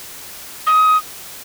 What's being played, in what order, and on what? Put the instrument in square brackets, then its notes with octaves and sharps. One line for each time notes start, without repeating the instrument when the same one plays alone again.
[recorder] D#6